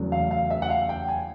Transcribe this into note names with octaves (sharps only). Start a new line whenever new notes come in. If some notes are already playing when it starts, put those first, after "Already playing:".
Already playing: E2 C#3 F#3 A3
F5
F5
E5
F#5
F5
G5
G#5